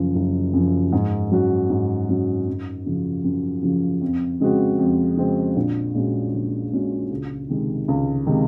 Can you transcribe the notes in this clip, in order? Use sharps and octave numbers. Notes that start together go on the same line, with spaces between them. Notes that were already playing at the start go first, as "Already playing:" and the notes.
Already playing: F#1 F#2 F3
F#1
F#2 F3
G#2
F#3 C#4 F#4
G#2
F#3 C#4 F#4
F#2
C#3 F3
F#2
C#3 F3
F2
C#3 G#3 C4 F#4
F2
C#3 G#3 C4 F#4
A#1
A#2 G#3 C#4 F#4
A#1
A#2 G#3 C#4 F#4
C#2
C3 D#3 G#3
C#2
C3 D#3 G#3